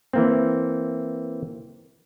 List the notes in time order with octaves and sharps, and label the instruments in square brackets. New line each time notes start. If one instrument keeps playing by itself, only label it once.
[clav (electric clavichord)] E3 A#3 C4